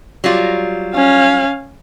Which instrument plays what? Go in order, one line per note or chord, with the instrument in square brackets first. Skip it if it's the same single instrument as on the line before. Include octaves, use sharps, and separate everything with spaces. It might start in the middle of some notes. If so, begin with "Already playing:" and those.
[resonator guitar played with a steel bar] F#3 G3 F4
[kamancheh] C#4 F5